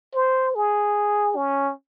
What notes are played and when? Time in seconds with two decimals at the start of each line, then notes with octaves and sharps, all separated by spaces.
0.15 C5
0.55 G#4
1.36 C#4